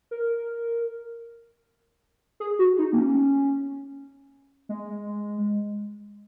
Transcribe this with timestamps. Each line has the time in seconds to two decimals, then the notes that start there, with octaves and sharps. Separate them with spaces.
0.11 A#4
2.40 G#4
2.59 F#4
2.78 D#4
2.93 A#3
2.98 C#4
4.69 G#3